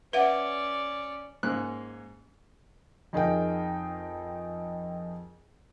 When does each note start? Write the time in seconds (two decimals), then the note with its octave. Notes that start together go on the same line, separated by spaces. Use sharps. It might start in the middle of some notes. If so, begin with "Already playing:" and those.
0.13 C#4 B4 D5 E5 F#5
1.43 G#2 A#3 C#4 F#6
3.13 F2 D#4 G#4 A#4 G5